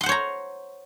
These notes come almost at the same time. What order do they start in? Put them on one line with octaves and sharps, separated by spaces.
C6 F#5 C5 C#5 A#5